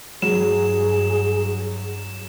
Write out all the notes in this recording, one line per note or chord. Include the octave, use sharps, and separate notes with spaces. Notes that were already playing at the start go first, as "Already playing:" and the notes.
G2 F#3 G#4 E7